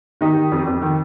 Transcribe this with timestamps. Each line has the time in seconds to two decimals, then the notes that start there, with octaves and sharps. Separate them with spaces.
0.21 D#3 D#4 G4
0.36 D#3
0.52 F2
0.67 F2
0.82 D#3